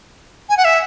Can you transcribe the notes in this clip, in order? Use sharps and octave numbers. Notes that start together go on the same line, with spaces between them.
G#5
F#5
E5